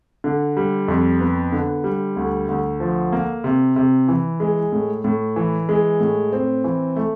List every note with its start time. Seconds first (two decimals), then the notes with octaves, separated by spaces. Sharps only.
0.24 D3
0.57 G3
0.88 F2
1.20 B3
1.52 D3
1.84 G3
2.16 D2
2.49 D2
2.80 F3
3.12 A#3
3.44 C3
3.76 C3
4.08 E3
4.40 G#3
4.72 A2
5.04 A2
5.36 E3
5.69 G#3
6.00 A2
6.33 C4
6.64 E3
6.96 A3